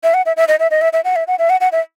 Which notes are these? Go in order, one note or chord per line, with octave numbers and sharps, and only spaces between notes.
E5
F#5
E5
E5
D#5
E5
D#5
E5
E5
F#5
E5
F#5
E5
F#5
F#5
E5